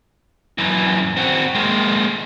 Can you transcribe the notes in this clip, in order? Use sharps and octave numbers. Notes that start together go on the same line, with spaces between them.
F#2 E3
C4 F#4
G#3 A#3